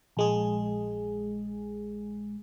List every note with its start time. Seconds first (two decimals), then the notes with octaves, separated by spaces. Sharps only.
0.17 A#1 G#3 G#4